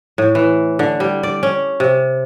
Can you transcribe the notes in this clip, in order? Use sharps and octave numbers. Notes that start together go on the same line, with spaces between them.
A2
E3
D3
G3
D5
C#4
C3